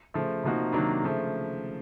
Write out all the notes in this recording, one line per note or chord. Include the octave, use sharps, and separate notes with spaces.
C#3 F3 A3
C3 F3 A#3 D#4 F#4
C3 D#3 F#3 A#3 D4
C#3 F3 A3